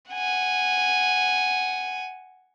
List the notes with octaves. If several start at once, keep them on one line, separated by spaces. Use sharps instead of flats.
F#5 G#5